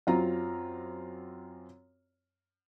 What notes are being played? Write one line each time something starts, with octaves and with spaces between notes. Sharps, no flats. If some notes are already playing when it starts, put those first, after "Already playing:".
F#2 C4 F4 A#5